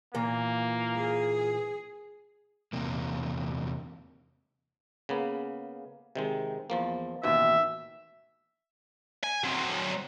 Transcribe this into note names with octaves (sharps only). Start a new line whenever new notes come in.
A#2 E3 A#3 F4
G#4
E2 C3 A#3
C#3 A#3 B3
C3 D#3 G#3
E2 F3 A#3
A1 D#2 B2 E5
G#5
F#3 C4